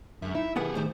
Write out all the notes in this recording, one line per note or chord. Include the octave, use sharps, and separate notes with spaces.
F#2 D3 G#3 E5
D#4 E4 E5
B1 D#3 B3 G4 G#4 F#5
A2 D#3 C5